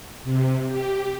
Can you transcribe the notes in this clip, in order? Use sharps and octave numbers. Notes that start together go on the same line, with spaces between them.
C3
G4